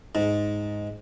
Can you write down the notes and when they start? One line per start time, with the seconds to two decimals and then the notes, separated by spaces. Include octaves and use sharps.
0.15 G#2